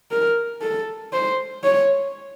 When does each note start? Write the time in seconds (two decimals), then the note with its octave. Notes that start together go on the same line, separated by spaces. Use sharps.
0.11 A#4
0.62 A4
1.13 C5
1.63 C#5